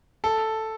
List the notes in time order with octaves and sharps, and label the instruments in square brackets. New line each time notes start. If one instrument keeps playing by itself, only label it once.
[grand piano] A4